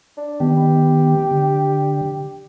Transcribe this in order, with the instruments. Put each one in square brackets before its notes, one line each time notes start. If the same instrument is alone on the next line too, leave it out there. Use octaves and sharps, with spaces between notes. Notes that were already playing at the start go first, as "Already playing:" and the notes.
[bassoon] D4
[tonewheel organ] D#3 B3 [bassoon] G4
[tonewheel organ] D3